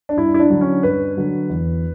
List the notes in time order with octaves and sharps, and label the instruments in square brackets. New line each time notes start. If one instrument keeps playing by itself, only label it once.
[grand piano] D4
G2 E4
E4
D4
D3 F#3
C#4
G2 B4
D3 F#3
E2